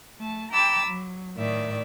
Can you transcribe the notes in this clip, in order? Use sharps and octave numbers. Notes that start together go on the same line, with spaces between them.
A3 A5
G5 A#5 B5 D6 E6 A6
F#3
A2 D#3 D5 E5